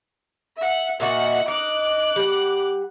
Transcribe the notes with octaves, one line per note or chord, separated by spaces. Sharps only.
E5 F#5
A#2 D#4 F#4 E5 F#5
D#4 D6 F#6
G3 F#5